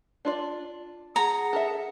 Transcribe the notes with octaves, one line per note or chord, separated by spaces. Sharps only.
D4 F4 D5
G#4 F#5 A#5
A4 A#4 E5